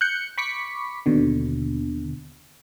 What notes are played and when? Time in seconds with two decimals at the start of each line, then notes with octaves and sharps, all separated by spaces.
0.01 F#6 G6 C#7
0.38 B5 C#6 D6 B6 C#7
1.06 D#2 B2 D3